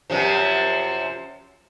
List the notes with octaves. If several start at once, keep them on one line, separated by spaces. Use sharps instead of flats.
F#2 C3 F3